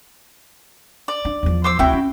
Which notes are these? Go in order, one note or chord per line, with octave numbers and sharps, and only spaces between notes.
D5
D4
E2 F3
C5 D6 E6
D2 C4 E4 F#4 G5
C#4